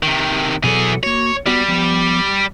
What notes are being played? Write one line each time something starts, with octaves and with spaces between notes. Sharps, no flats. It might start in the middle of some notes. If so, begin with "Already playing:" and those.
C3 D#3
B2 E3 F#3 G#4 A4
A#3 F#4 C#5
G3 B3 F#4 D5
F3 B3